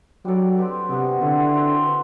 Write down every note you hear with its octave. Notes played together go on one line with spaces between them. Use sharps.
F#3 G3 D4 A4 D5
C4 G4 B4
C3 F#3 B3 D4
D3 C4 E4 B4
C4 F#4 A4 C5
B4